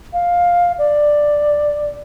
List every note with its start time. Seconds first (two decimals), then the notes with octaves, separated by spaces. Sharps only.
0.13 F5
0.79 D5